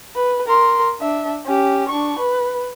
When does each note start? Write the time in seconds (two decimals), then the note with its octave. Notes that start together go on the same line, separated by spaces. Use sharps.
0.15 B4
0.47 A#4 C6
1.00 D4 E5
1.45 C#4 G4
1.89 D4 C#6
2.19 B4